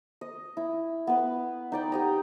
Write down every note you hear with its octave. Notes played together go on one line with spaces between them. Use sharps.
D#5
E4
B3 B4
D#4 D5 G5
G4 D#5 A#5